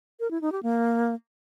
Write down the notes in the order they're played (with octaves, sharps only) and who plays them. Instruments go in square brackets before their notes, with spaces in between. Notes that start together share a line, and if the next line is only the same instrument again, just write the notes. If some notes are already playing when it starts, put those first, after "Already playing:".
[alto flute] A#4
E4
D#4
G4
A#3